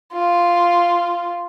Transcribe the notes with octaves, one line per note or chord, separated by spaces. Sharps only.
F4